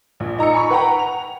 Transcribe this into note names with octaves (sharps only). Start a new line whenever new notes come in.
A#1
D#4 A#5 E6 C#7
G#5 B5 C#6
B4 F#5 G5 A#5
F7